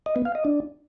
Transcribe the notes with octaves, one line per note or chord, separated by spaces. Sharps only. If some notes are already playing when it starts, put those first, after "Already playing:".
D#5
B3
F5
D#5
D4